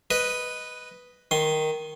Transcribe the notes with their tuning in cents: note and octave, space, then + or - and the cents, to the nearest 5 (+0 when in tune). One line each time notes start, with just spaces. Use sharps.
B4 +0 D#5 +0
D#3 +0 C6 +10